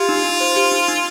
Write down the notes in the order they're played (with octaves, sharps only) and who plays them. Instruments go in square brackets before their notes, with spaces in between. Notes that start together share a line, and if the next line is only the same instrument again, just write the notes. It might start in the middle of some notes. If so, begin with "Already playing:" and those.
Already playing: [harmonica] F4 [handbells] G4
[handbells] D#4
D#4
C5
G4
D#4
D#4